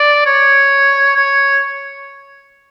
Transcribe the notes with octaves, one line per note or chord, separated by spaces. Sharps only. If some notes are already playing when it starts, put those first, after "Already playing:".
Already playing: D5
C#5
C#5